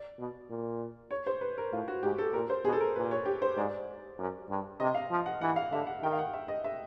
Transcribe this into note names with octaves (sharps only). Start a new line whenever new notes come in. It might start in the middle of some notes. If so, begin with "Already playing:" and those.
Already playing: D5
B2
A#2
C#5
C5
B4
A#4
A2 F4
F#4
G#2 G4
A4
A#2 A#4
C5
B2 G#4
A4
A#4
A#2 B4
C#5
G4
C5
G#2 D5
F#2
G2
C3 D#5
F5
F3
F#5
E3 F#5
F5
D3 E5
F#5
D#3 G5
F5
F#5
E5
D#5
E5